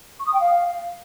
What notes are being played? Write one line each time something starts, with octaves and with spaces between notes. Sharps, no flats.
C#6
D#6
G5
F5